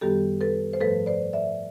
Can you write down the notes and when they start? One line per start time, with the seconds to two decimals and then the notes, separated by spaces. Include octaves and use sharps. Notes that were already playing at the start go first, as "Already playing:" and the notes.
0.01 F#2 D#3 G3 B3 G4 A4
0.41 A4 B4
0.73 C5
0.80 G#2 F3 A3 A4 B4
1.06 C5 D5
1.33 D5 E5